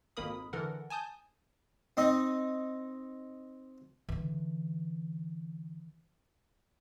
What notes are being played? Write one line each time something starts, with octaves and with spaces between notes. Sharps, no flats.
G#1 F2 A#3 A#4 B5 D#6
D3 E3 A4 A#4 F#5
G#5 A5 D#6 G6
C4 D#4 D#5
D3 E3